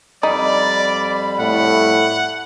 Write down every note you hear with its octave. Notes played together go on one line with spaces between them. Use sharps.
F2 G3 D#4 D5 B5
A2 F#5